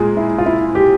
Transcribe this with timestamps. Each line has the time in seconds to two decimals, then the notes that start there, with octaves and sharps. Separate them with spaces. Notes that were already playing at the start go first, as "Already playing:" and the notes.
Already playing: A#2 G#3 G#4
0.17 E4
0.38 F4
0.46 E4
0.75 G4